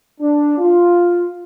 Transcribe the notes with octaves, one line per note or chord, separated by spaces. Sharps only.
D4
F4